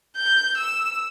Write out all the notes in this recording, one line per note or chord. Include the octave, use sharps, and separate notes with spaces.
G6
E6